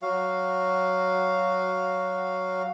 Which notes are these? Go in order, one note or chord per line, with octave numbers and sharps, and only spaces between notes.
F#3 F#4 F5